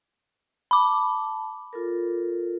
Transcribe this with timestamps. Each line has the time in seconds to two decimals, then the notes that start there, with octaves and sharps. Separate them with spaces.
0.71 A5 B5 D6
1.73 F4 A4 A#4